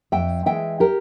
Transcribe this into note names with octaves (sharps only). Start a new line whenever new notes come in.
F2 E5 G5
E3 G#3 E5 G5
G4 A#4